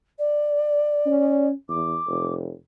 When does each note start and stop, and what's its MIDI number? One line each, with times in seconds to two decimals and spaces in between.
0.18 1.48 74
1.06 1.52 61
1.69 1.97 40
1.69 2.33 86
2.08 2.51 29